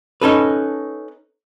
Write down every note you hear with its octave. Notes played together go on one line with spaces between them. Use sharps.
C#4 D#4 A4 B4